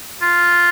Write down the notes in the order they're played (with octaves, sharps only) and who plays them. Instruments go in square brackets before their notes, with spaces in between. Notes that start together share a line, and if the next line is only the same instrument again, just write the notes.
[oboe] F4